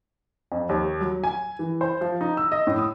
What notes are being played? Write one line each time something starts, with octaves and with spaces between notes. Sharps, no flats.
F2
D#2
F#3
G#5
E3
C5
F3
D#4
E6
D#5
A2
D#6